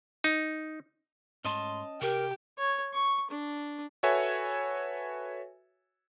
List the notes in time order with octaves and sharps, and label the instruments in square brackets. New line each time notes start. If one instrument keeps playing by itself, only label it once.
[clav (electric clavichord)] D#4
[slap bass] G#2 A3 [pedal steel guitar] C#4 D#5 A5 [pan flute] C6
[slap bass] C3 [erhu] G4 [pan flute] A#4
[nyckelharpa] C#5
C#6
D4
[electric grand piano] F#4 A4 B4 C#5 E5 G#5